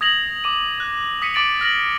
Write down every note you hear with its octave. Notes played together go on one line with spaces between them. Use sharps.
D#6 G#6 A#6 F7 F#7
D6 D#7
F#6
D#6 B6 C#7 D#7
D6 A6 D7 F#7
F6 A#6 F#7